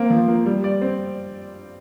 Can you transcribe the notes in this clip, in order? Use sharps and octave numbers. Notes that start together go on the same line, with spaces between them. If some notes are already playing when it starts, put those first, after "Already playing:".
Already playing: A#3 C4
F3
A#3
G3
D5
C4